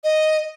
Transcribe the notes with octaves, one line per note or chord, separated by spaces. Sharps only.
D#5